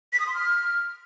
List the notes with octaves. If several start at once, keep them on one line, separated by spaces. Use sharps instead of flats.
B6
D#6
C6
F6